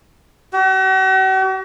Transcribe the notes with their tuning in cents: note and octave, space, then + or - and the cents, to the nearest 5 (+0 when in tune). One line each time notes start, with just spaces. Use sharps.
F#4 +45